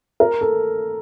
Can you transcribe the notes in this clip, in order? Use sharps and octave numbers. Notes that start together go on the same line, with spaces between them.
A#4
A4